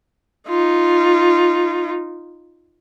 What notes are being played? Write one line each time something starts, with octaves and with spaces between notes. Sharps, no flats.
D#4 F4